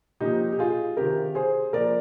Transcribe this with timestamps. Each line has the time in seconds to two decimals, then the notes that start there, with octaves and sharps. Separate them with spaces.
0.20 A#2 F3 D#4 G4
0.52 G4
0.59 F4 G#4
0.97 C3 D#3 G4 A#4
1.35 G#4 C5
1.73 A#2 F3 A#4 D5